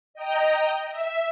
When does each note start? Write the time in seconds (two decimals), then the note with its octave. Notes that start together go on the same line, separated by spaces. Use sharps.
0.14 D#5 G5 A#5
0.90 E5